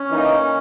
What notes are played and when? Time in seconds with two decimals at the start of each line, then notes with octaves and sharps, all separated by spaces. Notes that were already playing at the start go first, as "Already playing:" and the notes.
Already playing: C#4
0.10 E3 A#3 D#4